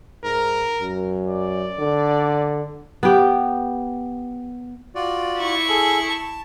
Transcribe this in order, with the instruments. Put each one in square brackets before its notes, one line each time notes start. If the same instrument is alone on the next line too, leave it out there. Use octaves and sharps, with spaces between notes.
[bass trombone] G#2 [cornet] A#4
[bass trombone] F#2
[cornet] D5
[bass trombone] D3
[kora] B3 G4
[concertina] F4 F#4 D5
[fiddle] E4 C#6
[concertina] G#4 A4
A5